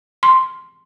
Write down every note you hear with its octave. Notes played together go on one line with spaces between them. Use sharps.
C6